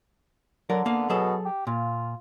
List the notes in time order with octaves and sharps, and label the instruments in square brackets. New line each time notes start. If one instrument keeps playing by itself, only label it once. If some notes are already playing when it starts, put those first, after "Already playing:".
[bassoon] D3 [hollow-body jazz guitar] F#3 A#4 D5
[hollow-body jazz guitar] A#3 B3 F5
[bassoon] B2 [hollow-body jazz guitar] F#3 G#4 A4
[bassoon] G4
[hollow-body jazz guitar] A#2 [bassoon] F4